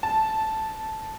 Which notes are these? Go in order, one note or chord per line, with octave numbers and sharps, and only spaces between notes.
A5